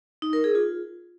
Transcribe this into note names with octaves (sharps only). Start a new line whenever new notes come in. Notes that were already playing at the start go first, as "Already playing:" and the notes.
D#4
A#4
G#4
F4